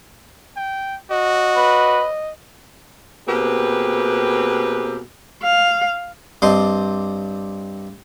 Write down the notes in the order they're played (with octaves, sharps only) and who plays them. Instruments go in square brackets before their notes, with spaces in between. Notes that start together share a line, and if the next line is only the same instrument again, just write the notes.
[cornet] G5
[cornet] F#4 [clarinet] D#5
[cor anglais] B4
[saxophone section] B2 A#3 C4 G4 G#4 B4
[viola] F5
[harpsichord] G2 C4 D4 D#5 C6